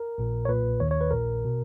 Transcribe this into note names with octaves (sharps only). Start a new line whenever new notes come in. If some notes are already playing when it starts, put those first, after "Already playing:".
Already playing: A#4
A#1 A#2
C#5
B1 A#2 B4
D#2 D#3 C#5
C#5
B4
A#1 A#2 A#4
B2